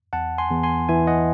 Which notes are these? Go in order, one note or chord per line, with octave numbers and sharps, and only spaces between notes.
E2 F#5 A5
G#5 C6
E2
G#5 C6
E3 E5 G#5
D#5 F#5